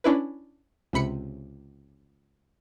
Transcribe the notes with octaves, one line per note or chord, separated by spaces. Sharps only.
C#4 D4 E4 B4
C#2 C3 B5 C#7